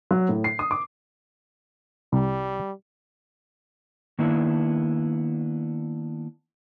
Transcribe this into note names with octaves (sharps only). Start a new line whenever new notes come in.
F#3
A2
C7
D#6
D6
C2 G3
D#3 A#3 B3 D4 E4